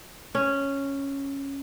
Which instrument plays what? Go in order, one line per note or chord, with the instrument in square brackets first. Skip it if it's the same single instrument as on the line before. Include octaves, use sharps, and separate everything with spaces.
[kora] C#4